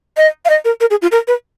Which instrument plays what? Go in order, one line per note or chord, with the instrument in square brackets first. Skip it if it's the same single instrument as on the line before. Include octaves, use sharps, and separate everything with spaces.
[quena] D#5
F5
D#5
A#4
A#4
G#4
F4
A#4
B4